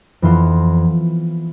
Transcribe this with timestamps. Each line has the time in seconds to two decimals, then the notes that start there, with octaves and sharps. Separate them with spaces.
0.22 F2 E3 B3 F4 A4